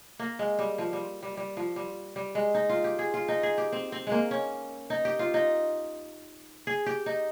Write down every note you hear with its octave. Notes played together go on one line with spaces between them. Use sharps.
A#3
G#3
G3
F3
G3
G3
G3
F3
G3
G3
G#3
D#4
F4
G4
G#4
F4
D#4
G#4
G4
C4
C4
G#3 A#3
C#4
D#4
G4
F4
D#4
G#4
G4
D#4